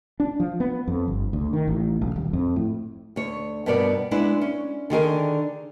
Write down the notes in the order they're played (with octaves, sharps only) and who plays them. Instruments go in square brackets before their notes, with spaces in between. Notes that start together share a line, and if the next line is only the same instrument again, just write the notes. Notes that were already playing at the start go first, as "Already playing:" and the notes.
[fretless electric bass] D4
F3
B3
F2
G1
D2
D#3
A1
B1
D#1
F2
A2
[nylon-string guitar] D2 C#5
G2 B2 B3 A#4 D5
G#3 B3 D4 E4
C#4
D3 D#3 G#4 A#4